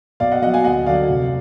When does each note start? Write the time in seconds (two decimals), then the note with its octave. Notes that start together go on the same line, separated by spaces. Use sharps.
0.20 B1 D5 F5
0.31 D#5 F#5
0.42 B2 F#3 D#5 F#5
0.54 F5 G#5
0.64 D2 D#5 F#5
0.86 D3 F#3 D5 F5
1.09 F1